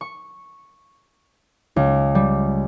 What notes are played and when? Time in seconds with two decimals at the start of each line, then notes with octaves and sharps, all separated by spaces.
0.01 C#6
1.76 C#2
2.15 G3